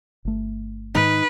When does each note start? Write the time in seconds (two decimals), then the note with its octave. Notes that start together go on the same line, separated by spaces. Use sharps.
0.25 G1 A3
0.95 G#2 D#3 D#4 B4